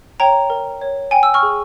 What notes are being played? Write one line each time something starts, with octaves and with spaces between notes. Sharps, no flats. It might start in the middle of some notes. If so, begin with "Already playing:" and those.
C#5 G5 A#5
A#4
C#5
G5 G#5
E6
C#6 F6
G#4